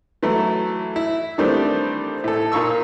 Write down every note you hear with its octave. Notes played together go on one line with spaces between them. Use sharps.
E3 F#3 A3 E4
E4
D#3 E3 G3 A3 C4 D4
A2 A4
A#2 D#4 F5 C#6 E6